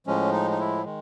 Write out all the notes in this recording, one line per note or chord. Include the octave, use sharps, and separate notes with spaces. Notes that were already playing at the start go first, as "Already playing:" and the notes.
A2 F3 G#3 C#4
D#4
D#4
E4
D#3 G#3